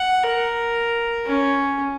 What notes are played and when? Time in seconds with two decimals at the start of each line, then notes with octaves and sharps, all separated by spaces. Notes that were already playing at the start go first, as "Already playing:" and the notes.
Already playing: F#5
0.24 A#4
1.26 C#4